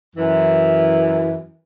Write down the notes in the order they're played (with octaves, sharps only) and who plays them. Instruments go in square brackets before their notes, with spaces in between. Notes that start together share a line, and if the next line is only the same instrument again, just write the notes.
[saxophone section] F#2 E3